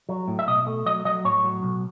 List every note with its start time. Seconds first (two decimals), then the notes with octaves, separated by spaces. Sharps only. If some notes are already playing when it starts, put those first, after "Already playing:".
0.09 F#3
0.28 A2
0.39 E5
0.47 B2 D#5
0.67 A3
0.86 F#3 D#5
1.05 F#3 D#5
1.25 A2 C#5
1.44 F#3
1.63 B1